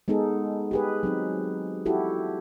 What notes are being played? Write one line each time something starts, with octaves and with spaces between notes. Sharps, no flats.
G#3 B3 D#4 G#4 A4
G4 G#4 B4
F#3 C4 D#4
E4 F#4 G4 A4